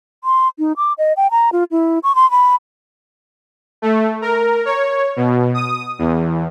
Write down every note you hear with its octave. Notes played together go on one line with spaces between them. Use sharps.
C6
D#4
D6
D#5
G5
A#5
F4
E4
C#6
C6
B5
A3
A#4
C#5
B2
D#6
E2